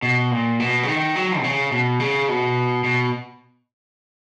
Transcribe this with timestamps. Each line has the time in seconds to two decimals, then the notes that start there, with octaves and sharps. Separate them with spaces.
0.02 B2
0.31 A#2
0.59 B2
0.83 C#3
0.88 D#3
1.15 F#3
1.39 B2
1.44 C#3
1.72 B2
2.00 C#3
2.28 B2
2.84 B2